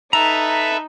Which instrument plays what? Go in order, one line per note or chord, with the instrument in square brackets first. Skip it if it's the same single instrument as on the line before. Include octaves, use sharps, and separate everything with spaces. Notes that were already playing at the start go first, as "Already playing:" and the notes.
[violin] D#4 [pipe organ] A4 B4 E5 [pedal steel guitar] A#5